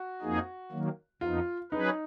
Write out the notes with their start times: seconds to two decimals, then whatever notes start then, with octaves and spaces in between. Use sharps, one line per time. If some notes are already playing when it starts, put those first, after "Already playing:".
Already playing: F#4
0.22 F2 F3 A#3 D#4 G#4
0.72 D#3 F#3 A#3
1.21 F2 F3 B3 D#4 F4
1.72 F#3 C#4 D#4 G#4 B4